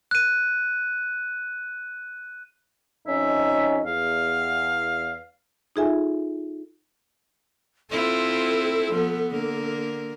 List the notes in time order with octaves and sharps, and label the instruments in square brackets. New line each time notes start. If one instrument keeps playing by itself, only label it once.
[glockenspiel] F#6 D#7
[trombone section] F2 C#4 D#4 [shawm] E5
[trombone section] E2 [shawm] F5
[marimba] D#4 F4 G#4 A4 E5 G#5
[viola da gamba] C4 E4 F4 [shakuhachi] A4
[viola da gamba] F3 B3
D3 A#3 A#4